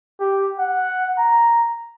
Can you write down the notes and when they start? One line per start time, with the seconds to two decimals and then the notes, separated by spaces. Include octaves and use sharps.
0.20 G4
0.59 F#5
1.18 A#5